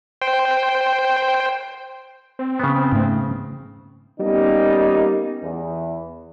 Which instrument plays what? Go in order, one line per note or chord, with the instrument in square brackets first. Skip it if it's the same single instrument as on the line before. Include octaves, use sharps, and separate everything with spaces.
[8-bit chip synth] C5 G5
[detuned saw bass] C4
[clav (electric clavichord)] C#3 B3
[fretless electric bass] G#2 A3
[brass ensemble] G3 A#3 B3 C#4 D#4
E2